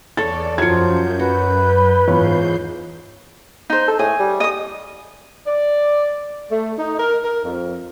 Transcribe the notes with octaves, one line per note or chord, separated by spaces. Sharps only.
E2 A4 C#5 D5 A6
F#2 F3 F#3 F4 G6 G#6 C#7
F#4 B4
E2 G#2 F4 C#5 G6 C7
D#4 C5
A4
A2 G#4
G3
D#5 D#6
D5
A3
D#4
A#4
A#4
F2